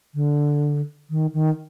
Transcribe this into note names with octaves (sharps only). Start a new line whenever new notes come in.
D3
D#3
D#3